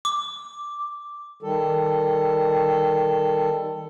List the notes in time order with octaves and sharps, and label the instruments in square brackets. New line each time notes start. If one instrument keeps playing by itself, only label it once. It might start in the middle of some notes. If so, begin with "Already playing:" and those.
[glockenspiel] D6
[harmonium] D#3 G3 A4